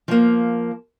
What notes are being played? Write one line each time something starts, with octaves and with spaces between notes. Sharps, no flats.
F3 A#3